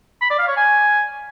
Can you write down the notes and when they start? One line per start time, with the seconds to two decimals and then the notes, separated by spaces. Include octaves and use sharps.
0.21 B5
0.30 D5
0.39 F5
0.48 C#5
0.57 G#5